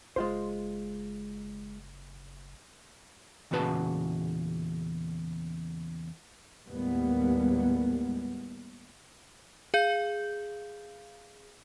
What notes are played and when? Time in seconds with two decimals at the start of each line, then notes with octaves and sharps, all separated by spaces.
0.16 F#1 G#3 F4 C5
3.51 E2 A#2 C#3 F#4 B4 A5
6.67 D#2 A2 G3 G#3 A#3 B3
9.74 G#4 F5 G6